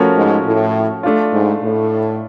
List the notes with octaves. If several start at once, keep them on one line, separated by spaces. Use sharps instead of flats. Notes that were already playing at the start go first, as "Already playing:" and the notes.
Already playing: F3 A3 C#4 F#4 A#4
G#2
A2
A3 D4 F4
G#2
A2